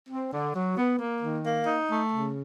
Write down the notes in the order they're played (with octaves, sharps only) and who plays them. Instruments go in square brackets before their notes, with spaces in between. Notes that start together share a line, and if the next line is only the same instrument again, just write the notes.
[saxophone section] C4
D3
F#3
B3
A#3
D#3
A#3
D#4
A3
C#3